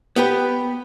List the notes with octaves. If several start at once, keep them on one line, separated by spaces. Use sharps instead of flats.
B3 G4 B4